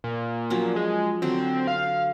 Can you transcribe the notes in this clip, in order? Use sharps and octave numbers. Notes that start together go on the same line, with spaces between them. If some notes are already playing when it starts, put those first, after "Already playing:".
A#2
F3 F#3 C#4
G#3
D3 F#3 C4
F5